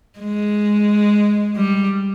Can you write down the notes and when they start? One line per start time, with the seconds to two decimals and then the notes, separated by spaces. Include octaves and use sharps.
0.19 G#3
1.56 G3